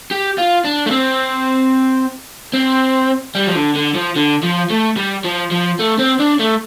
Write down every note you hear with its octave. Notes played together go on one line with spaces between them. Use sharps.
G4
F4
D4
A3
C4
C4
G3
F3
D3
D3
F3
D3
F3
A3
G3
F3
F3
A3
C4
D4
A3